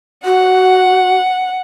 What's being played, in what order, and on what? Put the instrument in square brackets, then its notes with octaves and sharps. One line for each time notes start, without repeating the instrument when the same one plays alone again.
[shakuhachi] F#4 [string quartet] F#5